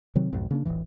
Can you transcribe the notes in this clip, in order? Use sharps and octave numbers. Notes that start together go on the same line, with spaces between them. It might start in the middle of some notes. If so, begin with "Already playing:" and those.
C3 D#3 F#3 C4
B1 F2 G#2
C#3 A#3 D4
D#1 A1 F#2 E3